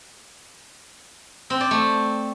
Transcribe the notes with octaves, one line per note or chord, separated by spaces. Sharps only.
C4
D5
A3